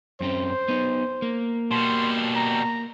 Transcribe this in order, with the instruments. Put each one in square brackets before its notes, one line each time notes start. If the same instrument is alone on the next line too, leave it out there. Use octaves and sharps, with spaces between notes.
[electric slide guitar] F#2 C4 C#4 [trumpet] C5
[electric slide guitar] B3 D#4
A#3
[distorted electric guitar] B2 G3 [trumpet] C6
[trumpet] A#5